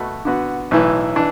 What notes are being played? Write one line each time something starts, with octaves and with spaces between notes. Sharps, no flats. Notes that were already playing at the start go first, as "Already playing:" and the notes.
Already playing: B2 A3 F#4 B4
D3 B3 F#4
B1 A2 E3
E3 D4